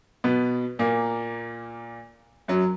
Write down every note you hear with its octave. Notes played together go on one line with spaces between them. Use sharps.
B2 B3
A#2 A#3
F#2 F#3